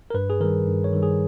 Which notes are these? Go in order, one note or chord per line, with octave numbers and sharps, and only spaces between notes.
A#4
G2 B4
G#4
D#3 G3 A#4
G2
C#5
D#3 G3
G#4